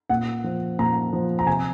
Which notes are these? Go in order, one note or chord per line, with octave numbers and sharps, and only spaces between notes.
A#2 F#5
F3
A#2 A#5
F3
A#5
C3 G#5